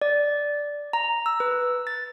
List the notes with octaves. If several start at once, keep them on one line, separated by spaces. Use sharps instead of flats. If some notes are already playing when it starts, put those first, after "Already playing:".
D5
A#5
E6
B4
A6